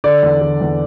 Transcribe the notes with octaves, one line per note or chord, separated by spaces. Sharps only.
D3 D5
E2
D3
E2